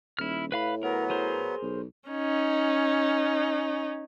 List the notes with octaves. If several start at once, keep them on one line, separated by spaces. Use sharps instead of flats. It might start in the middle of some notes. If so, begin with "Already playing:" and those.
D#1 E4 F6
A2 B4 F5 B5
F#3 B3 A#4
G#4 A#4 C5
B1
C#4 D#4